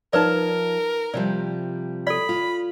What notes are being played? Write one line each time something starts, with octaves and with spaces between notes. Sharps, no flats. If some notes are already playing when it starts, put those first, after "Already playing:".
F3 D#4 A#4 B4 D5 A5
C3 F3 G3 D5
A4 D5 B5
F4